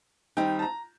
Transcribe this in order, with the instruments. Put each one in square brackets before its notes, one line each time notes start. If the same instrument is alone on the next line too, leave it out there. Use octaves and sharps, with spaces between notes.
[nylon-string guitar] D#3 G3 C4 D#4 [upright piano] G5
[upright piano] A5
A#5